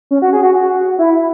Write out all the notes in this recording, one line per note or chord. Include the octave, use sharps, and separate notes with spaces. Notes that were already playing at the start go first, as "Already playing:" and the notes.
C#4
F#4
G#4
F#4
F#4
E4